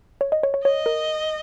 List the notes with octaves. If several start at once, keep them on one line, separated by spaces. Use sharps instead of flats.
C#5
D#5
C#5
C#5
C#5 D#5
A#4